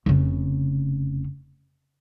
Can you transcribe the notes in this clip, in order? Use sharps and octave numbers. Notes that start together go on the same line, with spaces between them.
F1 C#3